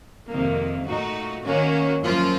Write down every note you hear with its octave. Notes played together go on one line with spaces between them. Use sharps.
F2 C3 D#3 A#3
A#2 A3 D#4 F#4
D#3 A#3 C#4 F#4
F#2 F3 A#3 F4